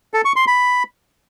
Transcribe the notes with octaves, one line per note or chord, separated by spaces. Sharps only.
A4
C#6
C6
B5